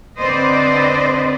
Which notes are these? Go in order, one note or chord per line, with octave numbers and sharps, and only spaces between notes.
D3 C4 B4 C5 D5 D#5